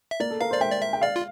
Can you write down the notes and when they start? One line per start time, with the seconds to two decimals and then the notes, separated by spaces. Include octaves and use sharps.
0.11 E5
0.20 A#3 D5
0.31 A4
0.41 A#4 F5
0.51 C5
0.54 D5
0.61 E5 G5
0.72 D5
0.82 E5
0.93 G5
1.01 D5 F5
1.16 F4